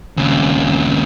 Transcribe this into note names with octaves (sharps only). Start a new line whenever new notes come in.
D#2 C#3